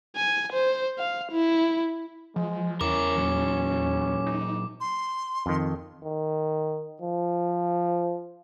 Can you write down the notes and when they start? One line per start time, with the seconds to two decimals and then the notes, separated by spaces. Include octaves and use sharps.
0.16 G#5
0.52 C5
0.98 F5
1.31 E4
2.36 F3 G#3
2.81 E2 C#4 E4 A#4 D6
3.17 A#2 F#3
4.26 D#4
4.81 C6
5.46 F2 D#3
6.03 D#3
7.01 F3